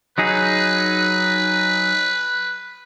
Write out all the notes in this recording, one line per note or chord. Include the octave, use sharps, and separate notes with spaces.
F#3 D#4 G#4 B4